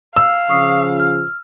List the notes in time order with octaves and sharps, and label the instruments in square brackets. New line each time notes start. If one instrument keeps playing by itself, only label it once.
[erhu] F5 [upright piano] E6
[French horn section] C#3 F3 [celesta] C#6 D#6 C7
[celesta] F6